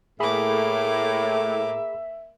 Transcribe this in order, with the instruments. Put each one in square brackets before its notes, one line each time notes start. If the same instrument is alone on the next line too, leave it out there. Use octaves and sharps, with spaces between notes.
[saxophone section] A2 [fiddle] A#3 D6 [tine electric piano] G#4 B5 [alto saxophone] E5